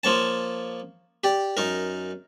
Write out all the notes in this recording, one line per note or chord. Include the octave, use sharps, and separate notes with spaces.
F3 A#3 C#5 A5
G4 D5
F#2 D#4 A#4